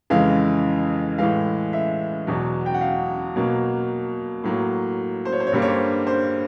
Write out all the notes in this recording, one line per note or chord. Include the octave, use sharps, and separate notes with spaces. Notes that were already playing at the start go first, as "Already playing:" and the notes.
F2 C#3 E3 G#3 F5
A2 E3 G#3 F5
E5
E2 B2 F#3
G5
F#5
F5
B2 F#3 A#3
A2 F#3 A#3
C5
C#5
C5
C#5
G2 D3 G3 A#3 C5
C#5
C5
C5